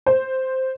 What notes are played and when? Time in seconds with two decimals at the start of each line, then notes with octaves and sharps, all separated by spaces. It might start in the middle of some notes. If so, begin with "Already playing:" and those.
0.06 C5